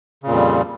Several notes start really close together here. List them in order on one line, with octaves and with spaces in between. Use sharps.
C#3 A#2 F2 G3